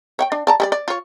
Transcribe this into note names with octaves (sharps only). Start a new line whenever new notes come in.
C#5 F#5 G5
D4
D5 A5 A#5
G3 G#4 D5
D5
F4 C#5